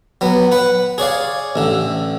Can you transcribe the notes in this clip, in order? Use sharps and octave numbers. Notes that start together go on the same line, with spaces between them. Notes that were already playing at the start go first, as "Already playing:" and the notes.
F#3 B3
B4 F#5
G#4 C#5 D5 F5
A1 D3